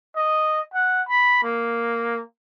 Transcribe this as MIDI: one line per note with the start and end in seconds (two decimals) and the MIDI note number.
0.16 0.61 75
0.74 1.02 78
1.08 1.41 83
1.43 2.21 58